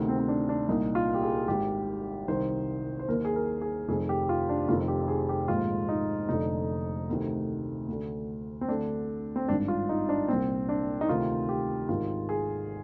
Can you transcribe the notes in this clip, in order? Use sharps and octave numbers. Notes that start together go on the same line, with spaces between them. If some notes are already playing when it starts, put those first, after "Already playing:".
Already playing: D2 C3 D#3
C4
C4
D4
D4
C2 A#2 D#4
F4
G4
G#4
G#1 G#2 D#3 G4
C2 C3 D#3 C5
C5
D#2 D#3 A#4
G#4
A#4
G#4
F1 F2 D#3 G#4
G4
F4
D4
F1 F2 D#3 F4
G4
G#4
G4
A#1 G#2 D#3 F4
D#4
F1 F2 D3 D#4
D2 C3 D#3
D2 D3
C4
D2 D3 D4
C4
G#1 G2 D#3 D4
F4
D#4
D4
C2 A#2 C4
D4
D#4
D2 C3 D#3 F4
G4
G#1 G#2 D#3 F4
G#4